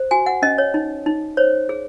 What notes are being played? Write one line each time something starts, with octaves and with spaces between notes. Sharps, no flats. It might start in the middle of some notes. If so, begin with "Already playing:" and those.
Already playing: C5
F#4 G#5
F#5
C#4 D#5
C#5
D#4
D#4
C5 C#5
G#4